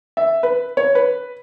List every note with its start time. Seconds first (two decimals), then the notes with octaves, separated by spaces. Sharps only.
0.17 E5
0.43 B4
0.77 C#5
0.95 B4